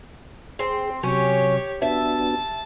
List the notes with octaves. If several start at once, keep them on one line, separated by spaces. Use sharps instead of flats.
C4 G#4 C5
C3 F#3 C#4 G4 C#5
B3 D4 F#4 E5 A5